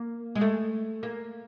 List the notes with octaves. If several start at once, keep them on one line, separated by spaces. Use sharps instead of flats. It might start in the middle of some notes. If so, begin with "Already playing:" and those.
Already playing: A#3
G#3
A3
A#3